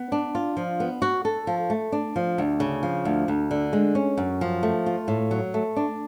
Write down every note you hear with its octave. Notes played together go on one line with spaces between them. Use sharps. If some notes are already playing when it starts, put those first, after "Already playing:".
Already playing: B3
D4
F4
F3
B3
F#4
A4
F3
A3
D4
F3
D2
C#3
F3
D2
D2
D3
G#3
C#4
F#2
F3
A3
F4
A2
F#3
A3
D4